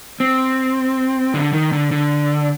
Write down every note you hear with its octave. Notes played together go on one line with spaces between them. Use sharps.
C4
D3
D#3
D3
D3